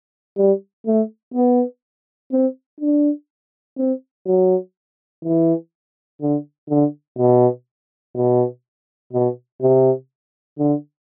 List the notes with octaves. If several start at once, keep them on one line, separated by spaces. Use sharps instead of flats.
G3
A3
B3
C4
D4
C4
F#3
E3
D3
D3
B2
B2
B2
C3
D3